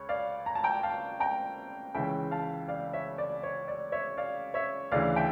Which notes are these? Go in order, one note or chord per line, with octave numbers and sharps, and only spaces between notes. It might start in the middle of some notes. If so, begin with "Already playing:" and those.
Already playing: C#2 C#5
D5 F5
A#5
A5
G5 A#5
F5 A5
G5 A#5
C#2 C#3 E3 E5 G5
F5 A5
D5 F5
C#5 E5
D5
C#5
D5
C#5 E5
D5 F5
C#5 E5
D2 C#3 E3 D5 F5
E5 G5